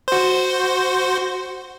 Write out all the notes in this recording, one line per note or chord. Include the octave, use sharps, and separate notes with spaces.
F#4 C5